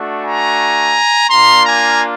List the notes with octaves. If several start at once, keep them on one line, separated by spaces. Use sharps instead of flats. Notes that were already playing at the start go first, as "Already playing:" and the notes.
Already playing: A3 D4 F#4
G#5 A#5
A#3 D4 F4 A#5 C6
G#5 A#5